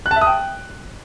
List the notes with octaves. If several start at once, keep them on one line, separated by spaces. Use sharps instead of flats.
F#6
A5
E5
D#6
G5